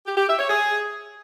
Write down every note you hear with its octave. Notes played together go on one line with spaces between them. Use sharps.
G4
G4
E5
C#5
G#4